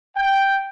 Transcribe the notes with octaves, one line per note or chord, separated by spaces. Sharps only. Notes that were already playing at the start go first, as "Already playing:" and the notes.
G5